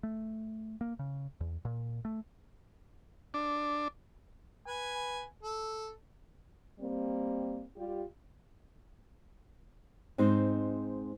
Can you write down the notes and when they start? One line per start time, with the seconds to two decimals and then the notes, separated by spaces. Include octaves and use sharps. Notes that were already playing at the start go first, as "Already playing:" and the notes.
0.03 A3
0.81 A#3
0.99 C#3
1.41 E2
1.65 A#2
2.05 A3
3.34 D4
4.67 B4 G#5
5.43 A4
6.80 G3 A#3 C4
7.76 G3 F4 G4
10.18 G#2 C4 D#4 C5